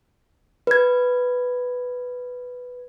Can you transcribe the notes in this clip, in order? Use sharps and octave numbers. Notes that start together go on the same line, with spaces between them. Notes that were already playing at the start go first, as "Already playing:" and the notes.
B4 G#6